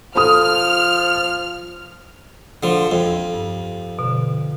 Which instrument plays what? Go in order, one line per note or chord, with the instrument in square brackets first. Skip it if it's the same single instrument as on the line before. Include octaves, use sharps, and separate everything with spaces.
[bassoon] F3 [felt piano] A4 D#6 [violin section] F6
[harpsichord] D3 F3
F2
[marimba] G2
B2 D3